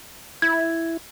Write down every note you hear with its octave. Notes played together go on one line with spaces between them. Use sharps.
E4 G#6